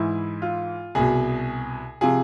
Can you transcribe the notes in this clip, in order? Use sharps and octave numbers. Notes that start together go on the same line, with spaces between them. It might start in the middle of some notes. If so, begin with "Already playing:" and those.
Already playing: G#2 E3 E4
F4
C2 B2 G#4
C3 F3 G#4